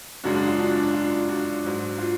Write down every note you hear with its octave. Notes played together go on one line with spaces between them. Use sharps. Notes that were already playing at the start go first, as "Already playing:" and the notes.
F#2 C#3 G#3 D4 F#4
D4 F#4
F4
D4 F#4
D4
D4
F4
D4 F#4
G#2 F#3
F4